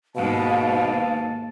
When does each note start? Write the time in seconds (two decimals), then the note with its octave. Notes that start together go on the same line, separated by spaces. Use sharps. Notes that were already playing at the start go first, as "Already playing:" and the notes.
0.16 D#2 G#2 B2 F5 A5